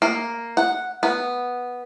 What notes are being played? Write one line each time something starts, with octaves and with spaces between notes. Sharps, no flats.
A#3
F#5
B3